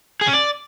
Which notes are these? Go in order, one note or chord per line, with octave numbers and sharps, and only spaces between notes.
G#4
C#4
D5